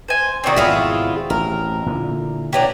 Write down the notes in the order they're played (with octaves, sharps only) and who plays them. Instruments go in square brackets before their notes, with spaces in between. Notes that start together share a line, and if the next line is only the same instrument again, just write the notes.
[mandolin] C5 G#5
[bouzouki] D#3 D4 [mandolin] C4 F#4
[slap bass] G#1 F2 B2 [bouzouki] E4 F4 G#4
[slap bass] A1 [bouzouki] A#4
[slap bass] A#2 D3 E3
[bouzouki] E3 F#3 D4 [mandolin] G4